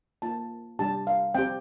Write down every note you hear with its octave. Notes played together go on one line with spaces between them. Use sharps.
A#3 F4 A5
G3 D4 G4 A5
F5
C4 G4 G5